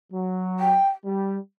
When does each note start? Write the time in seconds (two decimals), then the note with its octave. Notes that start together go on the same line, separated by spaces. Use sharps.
0.13 F#3
0.60 G5
1.06 G3